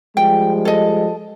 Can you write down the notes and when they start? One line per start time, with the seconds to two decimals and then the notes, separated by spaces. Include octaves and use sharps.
0.17 F3 G3 G#3 G5
0.65 A4 D#5